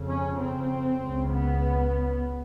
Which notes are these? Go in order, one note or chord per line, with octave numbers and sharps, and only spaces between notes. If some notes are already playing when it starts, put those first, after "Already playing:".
Already playing: F2 C#3
C#4
C4
C#2 C#3
B3